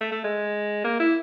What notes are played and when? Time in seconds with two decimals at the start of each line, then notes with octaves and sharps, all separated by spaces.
0.01 A3
0.12 A3
0.24 G#3
0.84 A#3
1.00 E4